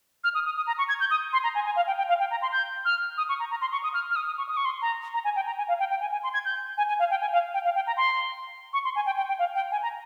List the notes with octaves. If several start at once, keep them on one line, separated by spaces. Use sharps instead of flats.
F6
D#6
D#6
D#6
A#5
C#6
G#6
G6
D#6
C6
A#5
G#5
G#5
F5
G5
G5
F5
G5
A#5
C6
G6
F6
D#6
C#6
A#5
A#5
C6
C#6
D#6
F6
F6
D#6
D#6
C#6
D#6
C#6
C6
A#5
A#5
G#5
G5
A#5
G#5
F5
G5
G5
G#5
G#5
C6
G#6
G6
G#5
G#5
F5
G5
G#5
F5
G5
F5
G5
A#5
C6
C#6
C6
G#5
G5
G5
G5
F5
G5
G#5
A#5